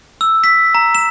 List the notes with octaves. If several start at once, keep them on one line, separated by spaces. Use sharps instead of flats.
E6
B6
A#5
E7